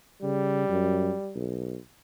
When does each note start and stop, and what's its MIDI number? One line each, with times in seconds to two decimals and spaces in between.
0.23 0.67 49
0.23 1.36 55
0.69 1.12 42
1.35 1.76 35